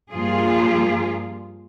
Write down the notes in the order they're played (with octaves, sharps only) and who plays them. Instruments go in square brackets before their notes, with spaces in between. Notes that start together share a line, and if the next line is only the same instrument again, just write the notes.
[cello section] G2 F3 A#3 F4 G#4